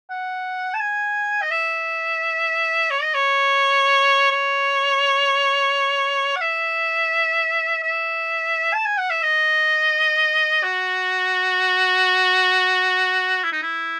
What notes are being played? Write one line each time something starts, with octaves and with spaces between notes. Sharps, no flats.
F#5
A5
G#5
D#5
E5
C#5
D#5
C#5
C#5
F#5
E5
E5
A5
G#5
F#5
E5
D#5
F#4
E4
D#4
E4